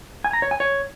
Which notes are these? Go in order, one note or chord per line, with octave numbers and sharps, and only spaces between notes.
G#5
A#5
C#5
G#5
C#5